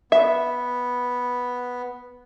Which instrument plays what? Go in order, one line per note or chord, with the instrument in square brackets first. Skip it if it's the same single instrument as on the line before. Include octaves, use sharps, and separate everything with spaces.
[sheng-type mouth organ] B3 [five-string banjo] E5